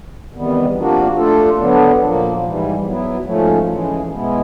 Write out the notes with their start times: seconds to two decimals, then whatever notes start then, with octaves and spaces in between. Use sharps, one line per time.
0.32 E2 C3 D#3 G3 B3
0.74 C3 F3 A#3 D4 F#4
1.16 A3 D4 F4 A4
1.58 D3 F#3 B3 D4
2.00 A#2 F3 A#3
2.42 G#2 E3 G3
2.84 F#3 B3 E4
3.25 G#2 F3 A3 C#4
3.68 C#3 E3 G#3
4.10 B2 G#3 B3 E4